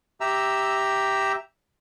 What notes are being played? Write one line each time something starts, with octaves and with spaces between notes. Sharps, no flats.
G4 E5 A#5 E6